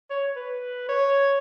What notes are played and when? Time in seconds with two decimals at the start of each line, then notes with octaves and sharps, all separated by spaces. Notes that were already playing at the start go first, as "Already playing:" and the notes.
0.10 C#5
0.36 B4
0.89 C#5